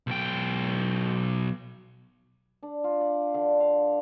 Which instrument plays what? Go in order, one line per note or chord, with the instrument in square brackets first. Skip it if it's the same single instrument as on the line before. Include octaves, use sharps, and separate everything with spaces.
[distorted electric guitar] B1 G5
[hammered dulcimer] D4
F4
D5
D3
F5